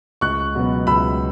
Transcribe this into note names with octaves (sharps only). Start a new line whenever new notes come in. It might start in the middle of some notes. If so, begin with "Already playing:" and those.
C#2 C#6 F#6
B2 F#3 B3
C#2 B5 E6